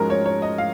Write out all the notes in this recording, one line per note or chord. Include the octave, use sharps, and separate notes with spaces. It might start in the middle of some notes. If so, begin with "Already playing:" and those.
Already playing: G#2 F3 G#3 C#4 F#4 A#4
C#5
C#5
D#5
F5